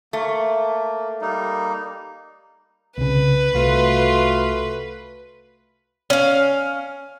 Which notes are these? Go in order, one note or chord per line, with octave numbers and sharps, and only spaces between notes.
A3 A#3
G3 A#3 D#4
C2 C#3 B4
C2 A3 F4 F#4 C6
C#4 F5